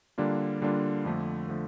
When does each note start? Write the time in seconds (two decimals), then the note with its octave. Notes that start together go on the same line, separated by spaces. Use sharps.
0.18 D3 G3 A#3 D4 F4
0.62 D3 G3 A#3 D4 F4
1.05 F2 D3 F3 A3
1.49 D3 F3 A3